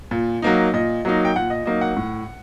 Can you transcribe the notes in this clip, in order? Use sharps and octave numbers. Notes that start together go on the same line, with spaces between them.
A#2
F#3 A#3 D#4
A#2 D#5
F#3 A#3 D#4
G5
A#2 F#5
D#5
F#3 A#3 D#4 D#5
F#5
A2